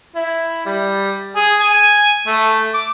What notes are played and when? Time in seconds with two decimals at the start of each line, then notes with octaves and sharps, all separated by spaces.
0.16 E4
0.66 G3
1.36 G#4
1.60 G#5
2.27 A3
2.74 D6